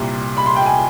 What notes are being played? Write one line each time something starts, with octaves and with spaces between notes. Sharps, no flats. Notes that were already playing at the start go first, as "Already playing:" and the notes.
Already playing: C2 A#2 G3
B5
C6
G5
G#5